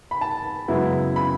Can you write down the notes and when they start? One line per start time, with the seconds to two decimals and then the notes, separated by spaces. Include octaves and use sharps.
0.11 B5
0.21 A5
0.68 F#2 C#3 G#3 B3 E4
1.16 B5